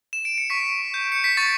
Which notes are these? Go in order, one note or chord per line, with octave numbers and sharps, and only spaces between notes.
E7
D7
C#7
C#6 B6
G6
C#7
B6
C#6 A6